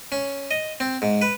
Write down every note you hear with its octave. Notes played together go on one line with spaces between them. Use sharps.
C#4
D#5
C4
G#2
B4